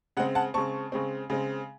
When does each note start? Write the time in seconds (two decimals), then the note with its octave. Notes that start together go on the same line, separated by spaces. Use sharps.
0.17 C#3 G#3 C4 F#5
0.35 F#5 A5
0.54 C#3 G#3 C4 A5 C#6
0.92 C#3 G#3 C4
1.30 C#3 G#3 C4